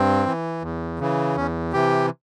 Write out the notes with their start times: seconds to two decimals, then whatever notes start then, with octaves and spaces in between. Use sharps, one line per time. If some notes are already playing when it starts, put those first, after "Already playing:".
Already playing: G2 C4
0.26 E3
0.62 E2
0.99 C#3 E3
1.36 E2 C#4
1.73 C3 E3 G4